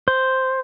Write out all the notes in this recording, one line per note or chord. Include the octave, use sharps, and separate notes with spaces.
C5